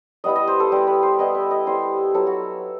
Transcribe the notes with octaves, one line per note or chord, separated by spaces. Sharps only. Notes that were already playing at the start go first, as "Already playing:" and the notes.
G3 B3 E4 D#5
D#5
C5
A4
G3 B3 E4 G4
B4
C5
G3 B3 E4 D#5
E5
D#5
G3 B3 E4 C5
F#3 B3 E4 A4
F#4